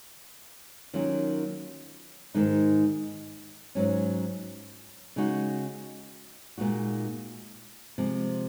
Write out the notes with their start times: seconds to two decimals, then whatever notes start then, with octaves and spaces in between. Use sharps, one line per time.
0.94 D#3 F#3 A#3 C#4 F4
2.34 G#2 D#3 G#3 D#4
3.75 G#2 F#3 C#4
5.16 C#3 G#3 D#4 F#4
6.58 A#2 G#3 D#4 F#4
7.98 C3 F3 G#3